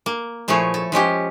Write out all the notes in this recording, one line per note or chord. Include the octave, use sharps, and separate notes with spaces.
A#3
A#2 F3 A3 E4 G#4 C#5
A4
F3 G#3 C#4 G4